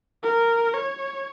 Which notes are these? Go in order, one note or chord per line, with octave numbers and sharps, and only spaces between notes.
A#4
C#5